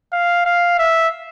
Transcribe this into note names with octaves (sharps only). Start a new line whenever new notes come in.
F5
F5
E5